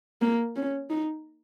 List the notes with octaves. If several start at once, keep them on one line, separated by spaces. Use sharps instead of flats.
A#3
C#4
D#4